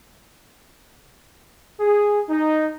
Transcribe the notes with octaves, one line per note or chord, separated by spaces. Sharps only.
G#4
D#4